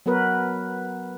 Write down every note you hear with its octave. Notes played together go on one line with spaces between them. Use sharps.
F#3 B3 F#4 A#4 B4